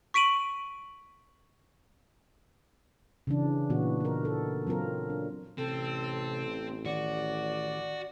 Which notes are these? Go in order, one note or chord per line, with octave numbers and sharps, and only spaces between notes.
C#6 B6 D7 D#7 F#7
C#3 E3 D4
A#2 E3 B3 F#4
D#4 A#4
A4
F#3 C4 F4 A#4
D4
A1 C3 C4 A4
D#3 F#4 D5